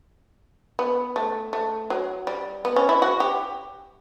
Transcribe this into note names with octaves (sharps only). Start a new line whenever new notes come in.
B3
A3
A3
F#3
G3
B3
C#4
E4
F#4
G4